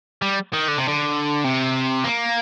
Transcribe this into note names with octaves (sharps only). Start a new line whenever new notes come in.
G3
D#3
D3
C3
D3
C3
A#3